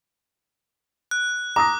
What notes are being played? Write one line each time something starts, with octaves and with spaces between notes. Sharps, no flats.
F#6
A#5 D6 D#6 A#6